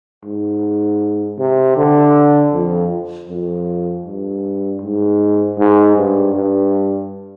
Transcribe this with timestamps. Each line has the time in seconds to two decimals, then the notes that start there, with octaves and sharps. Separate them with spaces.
0.24 G#2
1.39 C3
1.77 D3
2.53 F2
3.29 F2
4.06 G2
4.82 G#2
5.58 G#2
5.96 G2
6.34 G2